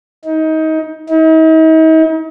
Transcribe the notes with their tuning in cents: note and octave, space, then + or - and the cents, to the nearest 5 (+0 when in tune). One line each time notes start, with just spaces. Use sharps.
D#4 +25
D#4 +45